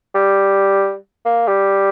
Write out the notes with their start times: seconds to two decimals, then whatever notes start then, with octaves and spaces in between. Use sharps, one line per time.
0.15 G3
1.25 A#3
1.48 G3